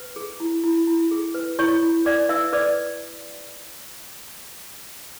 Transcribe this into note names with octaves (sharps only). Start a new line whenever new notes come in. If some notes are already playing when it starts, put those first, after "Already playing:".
Already playing: B4
G#4
E4
E4
E4
G#4
B4
E4 C#5 C#6
E4
B4 D5 D6
B4 E5 E6
B4 D5 D6